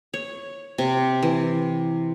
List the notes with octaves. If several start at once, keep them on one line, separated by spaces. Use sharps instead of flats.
C#5
C3
E3